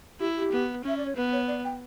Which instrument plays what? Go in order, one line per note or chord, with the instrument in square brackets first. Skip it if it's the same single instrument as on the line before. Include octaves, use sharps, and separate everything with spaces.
[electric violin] E4 [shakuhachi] G4
[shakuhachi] G4
[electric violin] B3
[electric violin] C#4 [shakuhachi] E5
[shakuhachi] D5
C#5
[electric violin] B3 [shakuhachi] B4
[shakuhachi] C#5
D5
G5